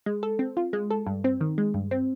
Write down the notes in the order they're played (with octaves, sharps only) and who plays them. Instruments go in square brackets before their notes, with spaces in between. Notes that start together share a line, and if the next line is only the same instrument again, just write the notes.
[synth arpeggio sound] G#3
A4
C4
F4
G#3
A4
G2
C4
D#3
G#3
G2
C4